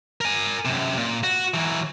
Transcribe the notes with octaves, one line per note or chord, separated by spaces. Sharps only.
A#4 G#5
F#2 C3
A#2
F#4
E3 F#3